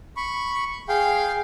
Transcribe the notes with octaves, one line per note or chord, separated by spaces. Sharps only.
B5 C#6
G#4 F5 G5